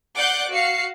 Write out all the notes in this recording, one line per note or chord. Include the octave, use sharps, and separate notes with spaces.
D5 F#5 D6 F#6 G6 C7
F#4 F5 C7 C#7